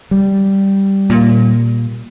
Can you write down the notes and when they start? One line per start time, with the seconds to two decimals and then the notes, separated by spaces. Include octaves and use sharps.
0.11 G3
1.10 A#2